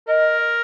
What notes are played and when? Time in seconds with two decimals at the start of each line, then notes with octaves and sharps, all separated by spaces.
0.08 A#4 D#5